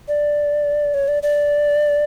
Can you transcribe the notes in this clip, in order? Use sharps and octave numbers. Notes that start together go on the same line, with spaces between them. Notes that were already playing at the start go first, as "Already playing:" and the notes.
D5
C#5
D5
D5